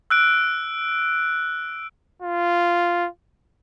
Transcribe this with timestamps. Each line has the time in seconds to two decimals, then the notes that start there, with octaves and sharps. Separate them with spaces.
0.10 E6 F#6 D7
2.22 F4